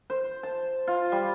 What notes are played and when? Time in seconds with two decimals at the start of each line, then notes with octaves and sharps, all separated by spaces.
0.10 C5
0.43 A5
0.88 F4
1.12 G3